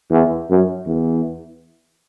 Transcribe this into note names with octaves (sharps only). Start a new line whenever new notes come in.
E2
F#2
E2